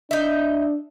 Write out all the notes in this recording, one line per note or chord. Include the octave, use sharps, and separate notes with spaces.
D4 D#4 E5